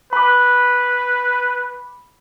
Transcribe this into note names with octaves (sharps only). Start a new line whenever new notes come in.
B4 B5 D6